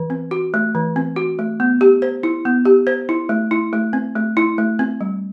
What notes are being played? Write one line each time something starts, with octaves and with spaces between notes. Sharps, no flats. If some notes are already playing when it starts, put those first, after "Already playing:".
Already playing: E3
C4
F#4
A3
E3
C4
F#4
A3
B3
G4
C5
E4
B3
G4
C5
E4
A3
E4
A3
C4
A3
E4
A3
C4
G3